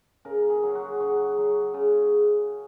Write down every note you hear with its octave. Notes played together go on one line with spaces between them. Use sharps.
C#3 A#4
G#4
F#3
F#4
C#3 F#4
F#3
C#3